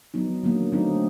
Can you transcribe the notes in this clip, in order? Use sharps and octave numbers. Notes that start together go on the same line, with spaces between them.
F#3 B3 D#4
D3 F#3 A#3
D3 F#3 A3 C4 D#4